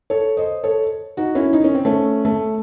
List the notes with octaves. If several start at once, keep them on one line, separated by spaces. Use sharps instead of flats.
A4 C#5
C5 D#5
A4 C#5
D#4 F#4
C#4 E4
D#4
C#4
C4
A3 C#4
A3